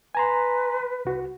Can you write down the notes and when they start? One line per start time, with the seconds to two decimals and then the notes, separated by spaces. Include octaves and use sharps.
0.15 B4 G#5 A#5 C6
1.05 C2 F#4